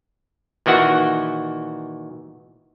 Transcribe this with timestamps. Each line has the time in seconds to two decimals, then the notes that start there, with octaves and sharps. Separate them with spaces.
0.66 A#2 D#3 E3 F#4 F#5